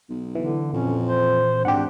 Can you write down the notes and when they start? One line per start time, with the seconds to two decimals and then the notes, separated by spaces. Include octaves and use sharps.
0.09 B1
0.35 D3 E3
0.73 F2 A#2 C#4
1.06 C5
1.65 G#1 G#2 D4 G4 F#5